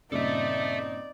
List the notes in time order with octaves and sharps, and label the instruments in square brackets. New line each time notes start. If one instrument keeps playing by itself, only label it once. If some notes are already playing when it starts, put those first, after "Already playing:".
[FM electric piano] G2 A#2 C#3 [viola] C4 D#4 [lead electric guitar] A4 E5 [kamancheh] D5